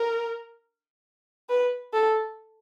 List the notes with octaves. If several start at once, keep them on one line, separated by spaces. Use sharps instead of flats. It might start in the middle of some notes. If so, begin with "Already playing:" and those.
Already playing: A#4
B4
A4